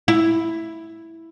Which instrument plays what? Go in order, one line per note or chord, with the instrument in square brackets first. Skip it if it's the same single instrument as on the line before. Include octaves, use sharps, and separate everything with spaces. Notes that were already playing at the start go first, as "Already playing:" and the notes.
[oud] E4